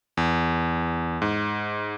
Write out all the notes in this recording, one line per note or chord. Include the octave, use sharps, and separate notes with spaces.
E2
G#2